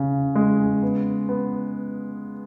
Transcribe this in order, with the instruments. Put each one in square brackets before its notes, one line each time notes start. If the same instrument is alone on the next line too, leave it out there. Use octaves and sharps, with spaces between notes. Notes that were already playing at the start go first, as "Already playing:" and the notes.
Already playing: [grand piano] C#3
G#3
B3
B3